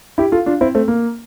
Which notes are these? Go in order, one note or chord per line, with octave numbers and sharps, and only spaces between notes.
E4 G4
F4 A4
D4 F4
C4 E4
A3 C4
A#3